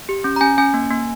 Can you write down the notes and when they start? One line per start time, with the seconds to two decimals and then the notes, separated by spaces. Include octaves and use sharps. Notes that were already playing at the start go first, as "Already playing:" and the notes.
0.09 G4
0.24 C#4
0.36 A#5
0.41 C#4 G#5
0.58 C#4 G#5
0.74 A#3
0.91 A#3